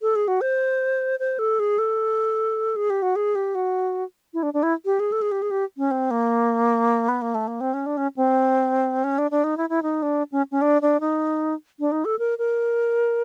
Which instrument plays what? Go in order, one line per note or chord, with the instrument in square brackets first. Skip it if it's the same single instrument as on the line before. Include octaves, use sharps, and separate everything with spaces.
[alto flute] A4
G#4
F#4
C5
C5
A4
G#4
A4
G#4
G4
F#4
G#4
G4
F#4
E4
D4
D4
E4
G4
G#4
A4
G#4
G4
G#4
G4
C#4
C4
A#3
B3
A#3
A3
A#3
C4
C#4
D4
C#4
C4
C#4
D4
D4
D#4
E4
E4
D#4
D4
C#4
C#4
D4
D4
D#4
D4
D#4
A4
A#4
A#4